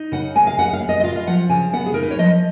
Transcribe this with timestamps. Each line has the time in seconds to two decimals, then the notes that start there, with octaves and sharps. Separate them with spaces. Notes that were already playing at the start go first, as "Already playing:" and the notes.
Already playing: D#4
0.12 C#3 F#5
0.35 G#3 G#5
0.47 F5
0.59 C#3 F#5
0.73 F5
0.82 B3
0.89 D#5
1.00 D#5
1.03 F4 F5
1.16 F5
1.27 F3 F#5
1.50 C#3 G#5
1.73 B3 F#5
1.86 G#4
1.94 D#4 A#4
2.03 B4
2.11 C#5
2.19 F3 D#5